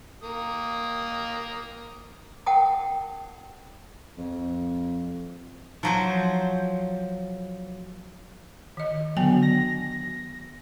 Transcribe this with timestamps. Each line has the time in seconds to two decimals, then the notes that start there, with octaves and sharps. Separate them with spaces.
0.23 A#3 D#6
2.46 A#4 F#5 G5 A5 D#6
4.18 F2
5.83 F3 F#3 C5
8.77 D#3 D#5
9.17 D3 F#3 B3 G5 G#5
9.42 A#6